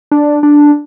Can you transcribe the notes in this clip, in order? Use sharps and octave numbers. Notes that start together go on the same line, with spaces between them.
D4
D4